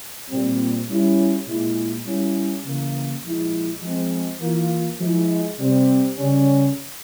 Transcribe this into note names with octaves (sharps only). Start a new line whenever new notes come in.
A#2 G3 C4
G3 C#4 E4
A#2 G#3 E4
G3 C#4 E4
C#3 E3 A#3
A#2 F3 G#3 E4
F3 G#3 C4
E3 A#3 F4
F3 G#3 E4
C3 G3 C4
C#3 G3 C#4